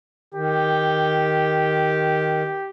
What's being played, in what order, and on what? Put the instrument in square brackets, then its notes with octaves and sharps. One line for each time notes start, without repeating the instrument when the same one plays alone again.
[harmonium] D#3 [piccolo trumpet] G4